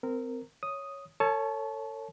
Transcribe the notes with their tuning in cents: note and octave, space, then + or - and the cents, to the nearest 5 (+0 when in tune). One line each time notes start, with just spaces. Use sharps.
C4 -25 A#4 -15
C#5 +0 D#6 +0
A4 +40 C#5 +0 A5 -30